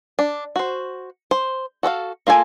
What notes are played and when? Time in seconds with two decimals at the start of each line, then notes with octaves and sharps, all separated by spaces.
0.19 D4
0.56 F#4 C5
1.31 C5
1.83 F#4 A4 C5 F5
2.27 A#3 F4 A4 G#5